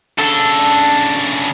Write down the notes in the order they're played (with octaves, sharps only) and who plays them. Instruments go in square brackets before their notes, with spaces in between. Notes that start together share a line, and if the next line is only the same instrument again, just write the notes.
[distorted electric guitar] C#3 D4 [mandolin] A4